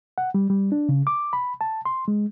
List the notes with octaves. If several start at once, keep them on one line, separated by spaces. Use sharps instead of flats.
F#5
G3
G3
D4
C#3
D6
B5
A5
C6
G#3